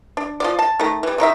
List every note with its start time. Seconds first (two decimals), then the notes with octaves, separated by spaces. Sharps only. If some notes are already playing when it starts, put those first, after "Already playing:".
0.17 D4
0.40 F3 B3 D5
0.59 A5
0.79 D#3 A3
1.03 E3 G3
1.18 D3 D#3 D#4 E5